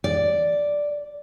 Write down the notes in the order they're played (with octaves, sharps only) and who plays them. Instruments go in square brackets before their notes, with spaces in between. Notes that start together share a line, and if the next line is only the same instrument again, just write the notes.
[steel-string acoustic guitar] D5